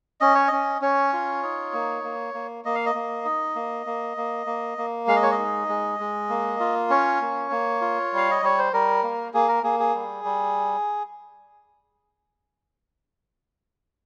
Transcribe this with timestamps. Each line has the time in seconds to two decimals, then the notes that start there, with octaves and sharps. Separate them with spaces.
0.21 C#4 D#5
0.35 C#5
0.48 C#4 D#5
0.81 C#4 C#5
1.13 F4
1.43 D#4
1.73 A#3
2.04 A#3
2.34 A#3
2.65 A#3 D#5
2.75 F5
2.86 D#5
2.95 A#3
3.25 D#4
3.55 A#3
3.86 A#3
4.17 A#3
4.46 A#3
4.78 A#3
5.07 G#3 F5
5.16 D#5
5.23 C#5
5.31 D#5
5.38 D#4
5.69 G#3
6.00 G#3
6.29 A#3
6.60 F4
6.90 C#4 C#5
7.21 A#3
7.51 A#3
7.81 F4
8.12 G3 F5
8.31 D#5
8.43 G3 C#5
8.58 C5
8.73 G3 A#4
9.03 A#3
9.34 A#3 G#4
9.48 A#4
9.64 A#3 G#4
9.80 G#4
9.95 G3
10.25 G3